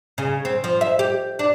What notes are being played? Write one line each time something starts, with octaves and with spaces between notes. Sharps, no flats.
C#3
C4
F3
E5
G4
D4